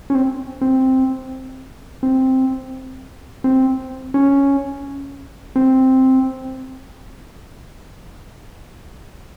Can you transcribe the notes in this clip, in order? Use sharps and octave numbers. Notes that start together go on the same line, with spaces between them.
C#4
C4
C4
C4
C4
C#4
C4